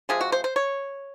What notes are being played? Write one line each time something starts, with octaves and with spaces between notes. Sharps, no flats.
C3 F3 G#3 G#4
F#4
C5
C5
C#5